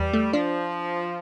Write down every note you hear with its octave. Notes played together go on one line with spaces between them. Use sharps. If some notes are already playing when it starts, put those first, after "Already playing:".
Already playing: E2 G3
A3
F3 D4